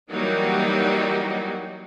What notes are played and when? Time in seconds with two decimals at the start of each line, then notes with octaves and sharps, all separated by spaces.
0.11 E3 F#3 G3 A#3 D#4 F#4